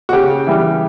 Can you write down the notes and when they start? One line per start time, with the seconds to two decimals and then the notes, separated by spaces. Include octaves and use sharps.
0.09 F#4
0.13 C#3 G4
0.47 E3 G3